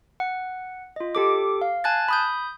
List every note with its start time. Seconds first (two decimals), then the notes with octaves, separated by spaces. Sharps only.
0.20 F#5
0.96 F4 D#5
1.15 G4 A4 D6
1.62 F5
1.84 G#5 A5 F#6 G#6 A6
2.09 B5 D#6 G6